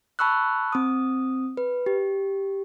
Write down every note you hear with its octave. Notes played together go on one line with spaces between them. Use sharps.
A5 B5 C#6 E6 F#6
C4 D#6
B4
G4